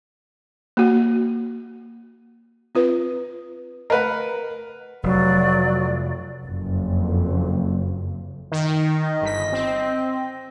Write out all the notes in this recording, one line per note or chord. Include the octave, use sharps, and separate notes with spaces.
A#3 F#4
C4 F4 B4
A#4 B4 D#5 F#5
F1 F#3 D5
F#1 F2
D#3
D#5
G1 B6
C4